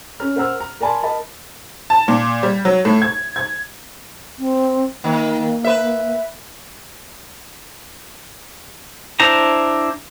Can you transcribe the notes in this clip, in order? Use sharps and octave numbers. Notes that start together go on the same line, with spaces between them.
C#4 C#5 A#5 F6
A#4 C5 F#5 A#5 E6 F6
A#5
A#4 D5 G#5 A5 B5 C6
A#4 D#5 A5 B5
A5
A#2
G3
F#3
A2
G#6
G#6
C4
D#3 A#3
B4 E5
D4 E4 C5 A5 A#5